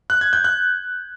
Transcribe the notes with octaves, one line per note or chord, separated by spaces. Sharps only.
F#6
G#6
G6
F#6